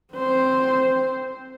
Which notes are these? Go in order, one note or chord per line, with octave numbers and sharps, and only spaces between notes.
C4 C5